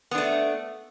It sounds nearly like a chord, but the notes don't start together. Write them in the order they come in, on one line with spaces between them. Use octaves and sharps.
B3 D4 A3